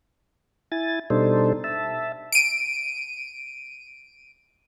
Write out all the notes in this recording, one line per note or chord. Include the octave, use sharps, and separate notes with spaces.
E4 G#5 A6
B2 G3 D4 D#4 A4 C5
E5 A5
D7 D#7